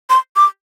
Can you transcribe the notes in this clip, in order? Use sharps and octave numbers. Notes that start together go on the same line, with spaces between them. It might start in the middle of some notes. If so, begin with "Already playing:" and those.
C6
D6